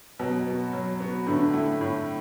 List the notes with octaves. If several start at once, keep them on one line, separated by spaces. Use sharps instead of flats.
B2 F#3
B3 F#4
F#3
B3 F#4
A2 D3
A3 E4
A2